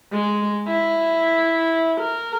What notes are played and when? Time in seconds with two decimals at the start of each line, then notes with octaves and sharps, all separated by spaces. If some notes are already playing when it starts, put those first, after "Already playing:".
0.12 G#3
0.67 E4
2.00 A#4